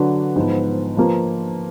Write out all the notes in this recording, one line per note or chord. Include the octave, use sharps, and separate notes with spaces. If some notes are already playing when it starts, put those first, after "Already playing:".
Already playing: D3 F#3 D4 F#4 B4
G#2 F3 B3
F3 A#3 F4 B4